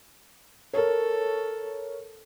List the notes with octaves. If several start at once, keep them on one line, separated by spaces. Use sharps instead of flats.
A4 A#4 C#5